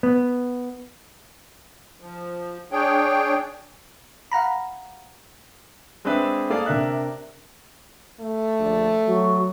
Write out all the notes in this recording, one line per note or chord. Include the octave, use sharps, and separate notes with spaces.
B3
F3
D4 G#4 C#5 G5
F5 F#5 A#5 B5
G#3 C4 D4 G#4 B4 E5
A#3 G#4 A4 D5 F5
C3 D4 A#4 E5 F#6
A3
A#1 D3 D5
F#3 F#4